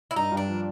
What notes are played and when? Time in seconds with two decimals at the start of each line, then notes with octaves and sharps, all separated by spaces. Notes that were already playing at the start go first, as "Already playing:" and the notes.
0.11 E4
0.16 G2 D#4
0.32 G2
0.37 D4
0.48 F3